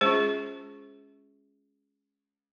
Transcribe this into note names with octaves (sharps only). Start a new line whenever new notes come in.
G#3 C#4 F4 G#4 C5